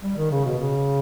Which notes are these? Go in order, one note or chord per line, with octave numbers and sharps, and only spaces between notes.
G3
D#3
C#3
B2
C#3